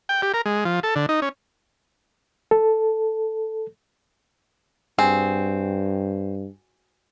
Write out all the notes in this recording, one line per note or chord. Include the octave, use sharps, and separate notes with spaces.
G5
G4
A#4
G#3
F3
A4
D3
D#4
C#4
A4
G2 C4 F#4 G#4